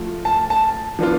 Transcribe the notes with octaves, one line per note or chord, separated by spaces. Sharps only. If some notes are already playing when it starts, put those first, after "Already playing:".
Already playing: F3 A3 F4
A5
A5
F3 B3 D4 F4